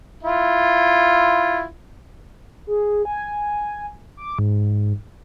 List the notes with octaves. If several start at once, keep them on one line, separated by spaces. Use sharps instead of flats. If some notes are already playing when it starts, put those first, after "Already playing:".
E4 F4
G#4
G#5
D6
G#2